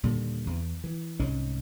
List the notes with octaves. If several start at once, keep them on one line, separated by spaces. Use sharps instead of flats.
D#2 A#2 D3 G3
E2
E3
C2 G#2 G#3 C#4